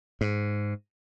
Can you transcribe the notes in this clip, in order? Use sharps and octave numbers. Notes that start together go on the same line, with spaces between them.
G#2